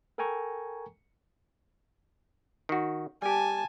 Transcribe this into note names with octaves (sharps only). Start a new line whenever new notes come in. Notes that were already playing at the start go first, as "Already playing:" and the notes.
A4 A#4 G5 G#5 A#5 C#6
D#3 F#4
G3 G4 G#5 A5